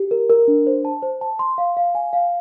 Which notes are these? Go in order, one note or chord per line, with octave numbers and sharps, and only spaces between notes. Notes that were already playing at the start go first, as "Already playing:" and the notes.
Already playing: G4
A#4
A#4
D4
C5
A5
C5
A5
C6
F5
F5
G#5
F5